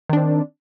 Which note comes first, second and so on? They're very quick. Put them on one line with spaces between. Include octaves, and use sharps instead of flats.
D#3 D4 C4